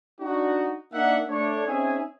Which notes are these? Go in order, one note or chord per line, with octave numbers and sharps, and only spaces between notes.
D4 D#4 F#4
A#3 D4 D#4 E5 F#5
A3 D4 C#5
C4 C#4 D#4 G#4 E5 G#5